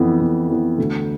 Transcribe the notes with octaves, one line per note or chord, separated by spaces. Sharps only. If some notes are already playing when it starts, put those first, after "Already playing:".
Already playing: F2 E3 B3
F2
E3 B3
D2